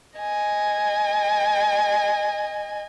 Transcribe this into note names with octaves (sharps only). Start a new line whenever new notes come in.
D#5 G#5